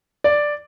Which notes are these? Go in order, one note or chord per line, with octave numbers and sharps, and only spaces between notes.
D5